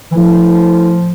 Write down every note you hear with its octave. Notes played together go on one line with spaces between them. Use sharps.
E3
A2 F3